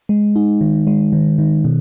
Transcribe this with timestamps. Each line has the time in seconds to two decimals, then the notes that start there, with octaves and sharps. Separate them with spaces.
0.09 G#3
0.36 D#4
0.61 D#3
0.87 G#3
1.13 D#3
1.39 D#3
1.64 B2